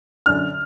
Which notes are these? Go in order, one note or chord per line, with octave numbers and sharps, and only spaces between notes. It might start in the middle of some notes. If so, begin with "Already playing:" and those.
F#2 D3 F6